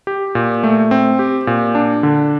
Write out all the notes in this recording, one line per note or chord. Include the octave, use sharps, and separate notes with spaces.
G4
A#2
A3
C4
G4
A#2
D4
D3